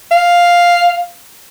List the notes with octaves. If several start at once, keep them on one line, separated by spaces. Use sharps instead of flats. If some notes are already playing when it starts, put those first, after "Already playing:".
F5